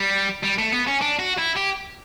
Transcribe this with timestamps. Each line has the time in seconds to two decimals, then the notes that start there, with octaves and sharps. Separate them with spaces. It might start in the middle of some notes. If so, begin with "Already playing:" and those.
Already playing: G3
0.44 G3
0.58 A3
0.72 B3
0.87 C#4
1.01 D4
1.19 F#4
1.38 E4
1.57 G4